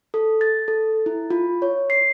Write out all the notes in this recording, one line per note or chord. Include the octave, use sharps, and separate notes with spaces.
A4
A6
A4
E4
F4
C#5
C7